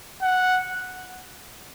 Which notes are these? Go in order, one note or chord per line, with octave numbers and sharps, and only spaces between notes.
F#5